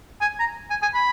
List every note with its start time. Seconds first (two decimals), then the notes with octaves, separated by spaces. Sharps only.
0.21 G#5
0.39 A#5
0.70 G#5
0.82 G#5
0.94 B5